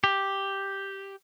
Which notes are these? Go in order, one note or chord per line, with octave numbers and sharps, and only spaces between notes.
G4